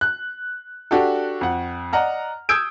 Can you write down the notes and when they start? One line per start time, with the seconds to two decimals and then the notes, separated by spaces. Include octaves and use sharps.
0.01 F#6
0.91 D4 F#4 G4 A4
1.41 F2 F#5
1.93 D5 D#5 F#5 A#5 F6
2.49 D#6 E6 G6 G#6 D7